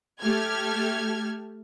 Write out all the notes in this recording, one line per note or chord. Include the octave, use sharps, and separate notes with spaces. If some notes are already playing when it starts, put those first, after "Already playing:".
A3 G4 A4 F6 G#6